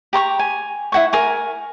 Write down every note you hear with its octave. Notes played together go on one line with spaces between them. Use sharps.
G4 A#5 C6 C#6
G#5
E4 F#5 C#6
A#4 G#5 C#6